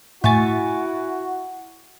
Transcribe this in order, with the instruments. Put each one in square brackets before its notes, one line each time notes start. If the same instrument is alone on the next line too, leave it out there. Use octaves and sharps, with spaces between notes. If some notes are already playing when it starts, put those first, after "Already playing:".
[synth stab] A2 A6 [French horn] E4 [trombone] F#4 [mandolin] E5 G#5 C#6